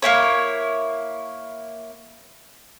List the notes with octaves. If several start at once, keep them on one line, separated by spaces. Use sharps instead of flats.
A#3 C4 E4 C#5